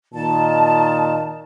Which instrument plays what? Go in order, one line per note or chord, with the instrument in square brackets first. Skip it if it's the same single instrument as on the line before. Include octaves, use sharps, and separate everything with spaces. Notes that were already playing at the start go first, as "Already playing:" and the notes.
[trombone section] A#2 D#3 [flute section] A5